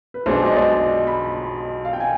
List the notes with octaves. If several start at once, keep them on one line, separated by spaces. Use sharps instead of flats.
B4
B1 B2 G#3 D4 C5
D#5
D5
D#5
B5
F5
G5
G#5